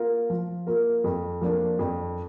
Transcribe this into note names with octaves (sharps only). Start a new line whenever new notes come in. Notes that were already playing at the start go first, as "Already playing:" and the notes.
Already playing: A#3 F4 A#4
F3
A#3 F4 A#4
F2
F3 A#3 D4
F2